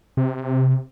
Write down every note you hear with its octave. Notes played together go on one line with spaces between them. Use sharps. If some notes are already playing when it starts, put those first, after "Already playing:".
C3